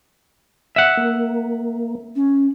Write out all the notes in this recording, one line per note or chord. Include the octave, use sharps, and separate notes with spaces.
E5 F#5
A#3
C#4